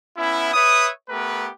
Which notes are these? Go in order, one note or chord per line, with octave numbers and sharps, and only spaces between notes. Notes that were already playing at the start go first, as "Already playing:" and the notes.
B3 C#4 E4
B4 C#5 E5 D#6
A3 B3 G4 A#4 B4